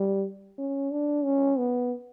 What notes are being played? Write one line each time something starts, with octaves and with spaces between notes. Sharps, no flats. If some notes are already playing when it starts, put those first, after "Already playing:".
Already playing: G3
C#4
D4
C#4
B3